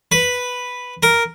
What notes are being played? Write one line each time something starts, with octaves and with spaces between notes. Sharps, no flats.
B4
A#4